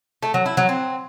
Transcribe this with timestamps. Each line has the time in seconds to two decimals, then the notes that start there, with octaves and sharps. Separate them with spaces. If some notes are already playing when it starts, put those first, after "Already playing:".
0.23 A3
0.34 F#3
0.46 E4
0.57 F#3
0.69 C4